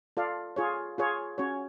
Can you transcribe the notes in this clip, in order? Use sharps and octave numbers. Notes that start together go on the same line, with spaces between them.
F4 A4 D5 F5
F4 G#4 C#5
F4 G#4 C#5
C#4 F#4 C#5